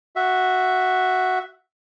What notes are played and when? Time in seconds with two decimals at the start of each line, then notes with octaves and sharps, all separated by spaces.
0.16 F#4 E5